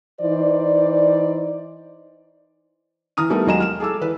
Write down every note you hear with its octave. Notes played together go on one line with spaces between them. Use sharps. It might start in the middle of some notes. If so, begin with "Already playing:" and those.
E3 D#4 C5 D5
E3 A#5 D#6 F6 D#7
G3 A3 B3 D#4 A#4
D#2 F#3 G#3 D#5 A#5 E7
F6 E7
G#4 A4 D6 E6
E3 B4